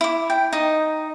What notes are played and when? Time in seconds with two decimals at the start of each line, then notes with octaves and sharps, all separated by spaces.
0.01 E4 D6
0.30 G5
0.53 D#4 D#5